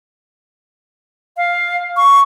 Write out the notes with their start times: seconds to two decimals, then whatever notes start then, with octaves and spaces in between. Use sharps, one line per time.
1.37 F5
1.97 C#6